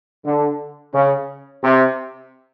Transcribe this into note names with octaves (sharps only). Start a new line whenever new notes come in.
D3
C#3
C3